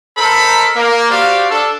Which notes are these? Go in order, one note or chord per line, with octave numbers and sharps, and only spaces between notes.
D#4 A4 A#4 C5 B5
A#3
F#4 G4 C5 D5 F5
D4 A4